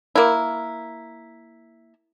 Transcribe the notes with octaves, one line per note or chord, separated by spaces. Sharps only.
A#3 E4